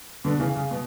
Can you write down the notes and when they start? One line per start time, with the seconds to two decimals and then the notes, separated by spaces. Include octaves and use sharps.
0.25 B2 D3
0.40 C#3 E3
0.55 C#3
0.71 B2